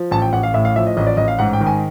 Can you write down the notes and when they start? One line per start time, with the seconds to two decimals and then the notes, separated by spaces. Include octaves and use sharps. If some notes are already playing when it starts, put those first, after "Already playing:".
Already playing: F3
0.11 A1 A5
0.22 G5
0.33 A1 F#5
0.43 F5
0.54 A2 E5
0.65 F5
0.76 F3 E5
0.87 D#5
0.97 A1 D#5
1.07 D5
1.17 A1 D#5
1.28 F5
1.39 G#2 F#5
1.53 G5
1.61 D#3
1.67 G#5